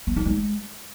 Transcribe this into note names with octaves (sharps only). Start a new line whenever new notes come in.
B3
D#4
G#3